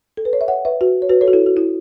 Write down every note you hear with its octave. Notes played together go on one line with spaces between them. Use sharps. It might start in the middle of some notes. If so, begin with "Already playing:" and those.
A4
B4
C#5
E5
C#5 F#5
B4 E5
F#4 B4
C#5
F#4 B4
A4 C#5
F#4
E4 A4
F#4
E4